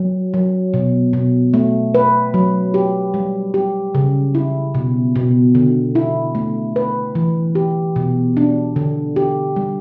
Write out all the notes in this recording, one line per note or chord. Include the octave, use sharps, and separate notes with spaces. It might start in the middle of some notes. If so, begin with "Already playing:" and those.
Already playing: F#3
F#3
B2
B2
A3
B4
F#3
G4
G3
G4
C#3
E4
B2
B2
D3
E4
A3
B4
E3
G4
B2
D4
D3
G4
G3